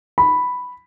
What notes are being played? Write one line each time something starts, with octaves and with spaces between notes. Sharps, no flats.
B5